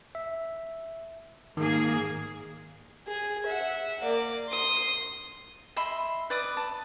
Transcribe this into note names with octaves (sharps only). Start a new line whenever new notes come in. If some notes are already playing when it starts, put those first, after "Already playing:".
E5
G#2 D#3 A#3 G#4
G#4
E5 F#5
A#3 D5
C6 D#6
D#5 E5 B5 C6
B4 D5 D6 D#6
A5